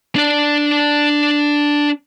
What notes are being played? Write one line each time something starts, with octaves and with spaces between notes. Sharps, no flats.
D4 D5